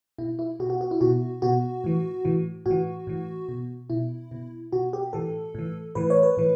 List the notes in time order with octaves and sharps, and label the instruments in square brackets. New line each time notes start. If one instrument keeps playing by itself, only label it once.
[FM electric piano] B2 E4
E4
B2 F#4
F#4
F#4
E4
B2 F#4
B2 F#4
A2 E3
A2 E3
A2 F#4
E3
A2 E3
B2
B2 E4
B2
B2 F#4
G4
A2 E3 A4
A2 E3
A2 E3 B4
C#5
B4
A2 E3